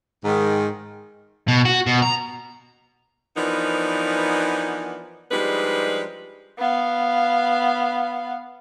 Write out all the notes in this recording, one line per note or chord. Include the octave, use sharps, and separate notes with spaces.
G#2 D#3
B2
F#4
B2
A#5
E3 F3 B3 D4 D#4 A#4
F3 G3 G#3 D4 D#4 B4
B3 F5